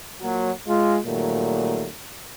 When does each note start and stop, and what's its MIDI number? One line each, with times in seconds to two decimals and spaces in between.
0.21 0.51 46
0.21 0.51 54
0.67 0.99 56
0.67 0.99 65
1.04 1.88 46
1.04 1.88 51
1.04 1.88 54
1.04 1.88 55
1.04 1.88 57